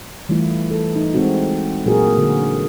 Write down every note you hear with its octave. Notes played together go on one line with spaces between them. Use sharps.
E3 G3 A3 E4 F4
A4
D#4
G#3 C4 D#4 F#4
A#2 F#3 A#3 F#4 G#4 A#4
D3 F#4